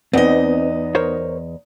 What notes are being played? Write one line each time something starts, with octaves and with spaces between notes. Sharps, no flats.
E2 B3 C4 D#4 D#5
A#4 C5 C#5